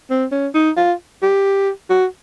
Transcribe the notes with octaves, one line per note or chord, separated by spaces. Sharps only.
C4
C#4
D#4
F4
G4
F#4